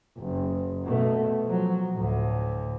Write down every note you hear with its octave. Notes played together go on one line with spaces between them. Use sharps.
F#1
B2 A3
F3 F#3
D2 A2